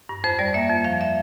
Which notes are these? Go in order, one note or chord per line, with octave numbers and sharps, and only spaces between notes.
G2
F2 C5
G3 D5
A#3 E5
F2
F3 F5
E5